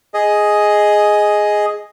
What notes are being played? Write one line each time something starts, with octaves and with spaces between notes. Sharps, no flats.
G#4 D#5